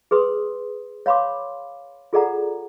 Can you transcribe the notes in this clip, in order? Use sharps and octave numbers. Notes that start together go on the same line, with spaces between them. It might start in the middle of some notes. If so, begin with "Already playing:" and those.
G#4 B4 C6 D#6
C#5 F5 B5 C6 D6
F4 G#4 A4 D5 F#5 A#5